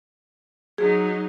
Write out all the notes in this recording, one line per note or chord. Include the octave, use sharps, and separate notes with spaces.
F#3 D#4 G#4